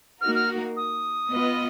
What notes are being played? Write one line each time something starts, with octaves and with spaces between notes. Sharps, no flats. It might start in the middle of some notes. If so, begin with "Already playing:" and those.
A#3 D#4 F#4 A#4 F6
F6
D#6
B3 F4 B4 D#5